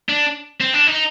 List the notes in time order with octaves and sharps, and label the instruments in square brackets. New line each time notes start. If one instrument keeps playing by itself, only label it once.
[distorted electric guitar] D4
C4
D4
D#4